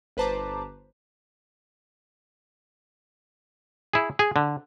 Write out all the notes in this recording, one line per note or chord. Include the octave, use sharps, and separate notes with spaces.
G1 B4 C5 A5 A#5 D6
E4 G#4
G#4
D3